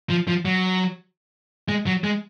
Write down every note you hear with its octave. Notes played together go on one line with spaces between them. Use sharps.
F3
F3
F#3
G#3
F#3
G#3